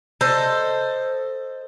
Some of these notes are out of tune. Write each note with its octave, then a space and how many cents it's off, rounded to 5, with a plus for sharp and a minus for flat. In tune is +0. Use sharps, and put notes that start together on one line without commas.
A4 +15 C5 +0 D#5 +0